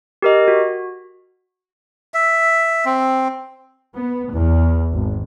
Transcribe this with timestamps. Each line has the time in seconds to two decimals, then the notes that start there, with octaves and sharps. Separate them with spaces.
0.22 G4 A#4 D#5
0.48 F#4
2.14 E5
2.85 C4
3.93 B3
4.31 E2
4.93 G#1